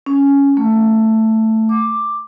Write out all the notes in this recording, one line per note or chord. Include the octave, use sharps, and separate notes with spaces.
C#4
A3
D6